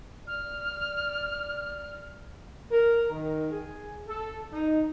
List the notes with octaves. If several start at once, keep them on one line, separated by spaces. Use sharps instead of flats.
D5 F6
A#4
D#3
G#4
A4
D#4